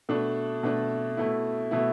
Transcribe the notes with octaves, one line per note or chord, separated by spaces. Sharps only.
B2 A3 D4
B2 A3 D4
B2 A3 E4
B2 A3 E4